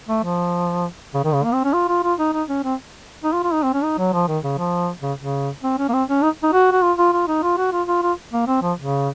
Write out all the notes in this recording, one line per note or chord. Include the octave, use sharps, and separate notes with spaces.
A3
F3
C#3
D#3
C#3
A#3
C4
C#4
F4
F4
F4
D#4
D#4
C#4
C4
D#4
F4
F4
D#4
C4
C#4
D#4
F#3
F3
D#3
C#3
F3
C#3
C#3
C4
C#4
A#3
C4
C#4
D#4
D#4
F#4
F#4
F4
F4
F4
D#4
F4
F#4
F4
F4
F4
A#3
C4
F3
C#3